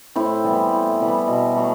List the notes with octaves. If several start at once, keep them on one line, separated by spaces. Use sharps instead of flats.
A2 C4 E4
E3 G3 B3
A2
E3 G3 B3
B2
F#3 A3